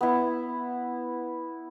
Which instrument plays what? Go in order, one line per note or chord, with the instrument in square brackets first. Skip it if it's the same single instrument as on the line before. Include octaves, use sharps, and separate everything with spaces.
[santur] B3 E4